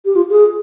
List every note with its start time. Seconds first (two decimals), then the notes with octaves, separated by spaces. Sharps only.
0.05 G4
0.15 F4
0.30 G#4